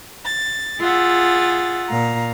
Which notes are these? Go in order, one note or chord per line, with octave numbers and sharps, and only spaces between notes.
A6
F4 G#4 E5 F#5 A6
A#2 F5 A#5